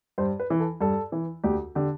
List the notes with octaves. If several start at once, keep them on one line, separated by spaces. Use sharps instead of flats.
G2 C5
B4
E3
A4
G2 A4
E3
D2 G4
D3 G4